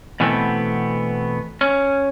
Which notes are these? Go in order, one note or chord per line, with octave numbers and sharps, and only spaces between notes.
B2 E3 G3 A3 B3 C4
C#4